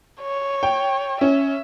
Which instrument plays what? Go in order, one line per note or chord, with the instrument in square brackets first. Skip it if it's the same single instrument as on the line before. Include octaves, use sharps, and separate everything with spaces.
[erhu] C#5
[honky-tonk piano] G5
[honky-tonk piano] C#4 [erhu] E5